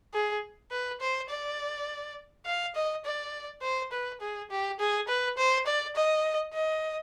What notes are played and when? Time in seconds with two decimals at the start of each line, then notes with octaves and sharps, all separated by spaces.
0.14 G#4
0.71 B4
1.01 C5
1.30 D5
2.46 F5
2.75 D#5
3.05 D5
3.62 C5
3.92 B4
4.21 G#4
4.51 G4
4.80 G#4
5.08 B4
5.38 C5
5.66 D5
5.95 D#5
6.54 D#5